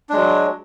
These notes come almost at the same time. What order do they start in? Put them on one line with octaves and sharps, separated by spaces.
D4 G#3 F#3